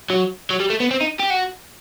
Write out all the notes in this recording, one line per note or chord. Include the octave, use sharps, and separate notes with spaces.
F#3
F#3
G3
A3
B3
C4
D#4
G4
F#4